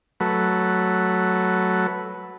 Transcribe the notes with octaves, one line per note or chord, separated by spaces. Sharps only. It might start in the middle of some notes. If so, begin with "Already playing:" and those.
F#3 A3 B4